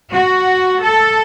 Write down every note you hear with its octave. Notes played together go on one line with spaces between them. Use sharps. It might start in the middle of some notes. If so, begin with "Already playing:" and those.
F#4
A4